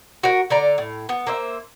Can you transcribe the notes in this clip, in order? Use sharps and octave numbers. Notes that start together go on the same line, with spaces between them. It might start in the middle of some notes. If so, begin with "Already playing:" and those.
F#4 A#4
D3 D5 A#5
A2
B3
A#3 C5 E5